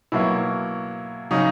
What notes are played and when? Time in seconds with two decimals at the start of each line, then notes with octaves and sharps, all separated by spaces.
0.12 B2 F#3 A#3 E4
1.31 C#3 F#3 D#4